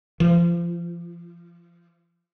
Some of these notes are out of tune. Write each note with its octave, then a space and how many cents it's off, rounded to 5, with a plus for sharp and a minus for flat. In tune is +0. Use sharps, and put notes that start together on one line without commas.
F3 -30